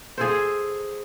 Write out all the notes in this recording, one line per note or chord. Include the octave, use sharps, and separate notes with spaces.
G#4 A4 C5